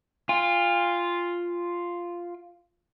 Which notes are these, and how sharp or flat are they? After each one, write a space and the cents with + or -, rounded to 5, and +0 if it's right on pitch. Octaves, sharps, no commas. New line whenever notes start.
F4 +0 G#5 -45